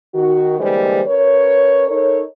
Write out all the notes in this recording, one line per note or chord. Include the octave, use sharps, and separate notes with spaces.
D#3 F#4
D3 E3 G3 G#3 A#3 C5
C#4 A#4 B4 C#5
D#4 A4 A#4 C#5